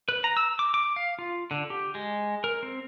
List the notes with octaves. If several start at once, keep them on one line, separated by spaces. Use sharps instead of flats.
B4
A#5
E6
D6
D6
F5
F4
D3
G4
G#3
A#4
C4